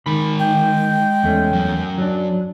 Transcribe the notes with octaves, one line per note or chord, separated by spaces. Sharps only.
D#3 G#3 B5
G5
E2 A3 C#4
F#2
F#3 D4